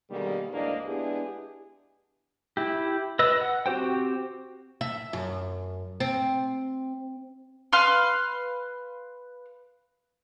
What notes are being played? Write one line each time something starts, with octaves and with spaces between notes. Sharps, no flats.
B2 D3 D#3 G3 G#3 A#3
D2 G#2 E3 A#3 D4 D#5
G#3 B3 D4 E4 G4 G#4
E4 G4
B4 D#5 E6
F#5
C4 F#4 G4 C5 G5
E5
F#2
C4
B4 F5 C6 F6